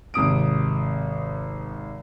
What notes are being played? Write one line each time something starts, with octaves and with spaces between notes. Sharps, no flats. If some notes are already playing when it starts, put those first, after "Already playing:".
G#1 C3 D#6 D7